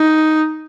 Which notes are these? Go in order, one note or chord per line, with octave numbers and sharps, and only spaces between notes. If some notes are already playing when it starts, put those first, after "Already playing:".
Already playing: D#4